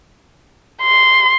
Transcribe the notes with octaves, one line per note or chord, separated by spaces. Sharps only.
C6